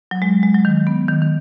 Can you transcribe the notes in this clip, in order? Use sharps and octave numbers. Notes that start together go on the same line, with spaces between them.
F#3
G#3
G#3
F#3
D#3
B3
D#3
D#3